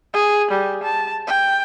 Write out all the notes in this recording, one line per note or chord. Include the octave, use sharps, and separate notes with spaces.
G#4
G3
A5
G5